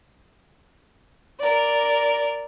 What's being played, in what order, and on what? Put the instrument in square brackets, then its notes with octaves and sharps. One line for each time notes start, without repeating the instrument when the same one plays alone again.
[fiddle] A#4 D5